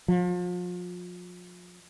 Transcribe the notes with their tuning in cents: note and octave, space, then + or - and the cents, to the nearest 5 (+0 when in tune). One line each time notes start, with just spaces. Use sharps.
F3 +35